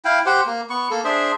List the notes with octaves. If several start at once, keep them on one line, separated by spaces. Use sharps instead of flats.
E4 F5 G5
G4 C5 F#5
A#3
B3 C#6
A#3 A4
D4 G#4 C5 E5